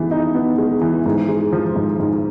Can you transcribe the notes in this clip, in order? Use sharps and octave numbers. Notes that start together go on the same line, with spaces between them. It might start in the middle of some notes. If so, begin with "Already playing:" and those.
Already playing: E3 G#3 B3 D#4
D#4
B3
G#3
E3
G#2
G#3
F3
G#2
G#2